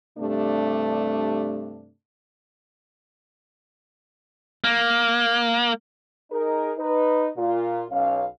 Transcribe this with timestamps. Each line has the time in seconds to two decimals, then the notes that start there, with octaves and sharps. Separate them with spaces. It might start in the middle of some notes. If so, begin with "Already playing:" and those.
0.18 G2 C3 A3 D4
4.64 A#3
6.31 D#4 G#4 A#4
6.78 D#4 B4
7.37 A#2 F4
7.90 B1 C#4 F5